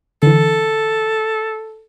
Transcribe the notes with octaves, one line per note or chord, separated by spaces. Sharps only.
D3 E3 A4